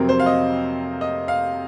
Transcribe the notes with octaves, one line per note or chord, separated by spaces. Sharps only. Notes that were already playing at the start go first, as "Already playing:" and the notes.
Already playing: F2 C3 F#3 C4 A#4
C5
F5
D#5
D#5
F5